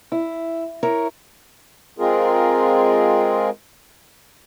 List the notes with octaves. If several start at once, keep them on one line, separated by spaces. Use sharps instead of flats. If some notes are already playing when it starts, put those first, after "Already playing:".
E4
E4 A#4 C#5
G#3 C4 F4 G#4 A#4